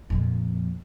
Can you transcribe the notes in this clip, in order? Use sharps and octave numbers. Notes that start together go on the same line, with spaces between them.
F2 A#2